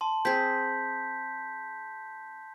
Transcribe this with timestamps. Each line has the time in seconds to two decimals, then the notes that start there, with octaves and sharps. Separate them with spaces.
0.01 A5 C6
0.25 C4 G#4 G6 B6